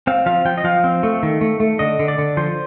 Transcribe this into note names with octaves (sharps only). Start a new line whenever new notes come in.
C4 F5
F3 F5
F3 G5
D#5
F3 F5
C4
A3
D#3
A3
A3
D3 D#5
D3
D5
D3
F3 C5